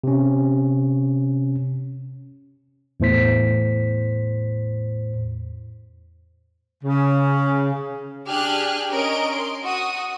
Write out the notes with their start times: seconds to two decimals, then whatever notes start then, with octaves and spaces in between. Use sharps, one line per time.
0.04 C3 C#4
3.00 E2 A2 C5 B6
6.84 C#3
8.28 D4 G4 G#4 G#5 F6 F#6
8.90 C#4 A#4 D#5 D7
9.34 C6
9.63 F#4 D#6